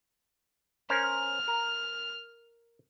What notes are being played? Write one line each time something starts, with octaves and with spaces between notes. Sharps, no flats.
C#4 A#4 C5 F6
A#4